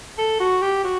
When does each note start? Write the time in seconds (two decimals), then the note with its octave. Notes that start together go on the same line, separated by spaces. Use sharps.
0.18 A4
0.40 F#4
0.62 G4
0.84 F#4